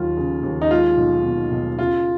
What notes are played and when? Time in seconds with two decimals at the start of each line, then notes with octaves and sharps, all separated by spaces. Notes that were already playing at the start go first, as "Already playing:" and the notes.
Already playing: D#2 F#3 F4
0.17 C#3
0.43 D#2
0.61 D#4
0.70 G#3 F4
0.97 B1
1.24 B2
1.51 B1
1.79 C#3 F4